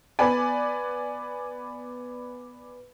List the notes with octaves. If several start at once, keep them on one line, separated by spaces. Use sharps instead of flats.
B3 B4 D5 G#5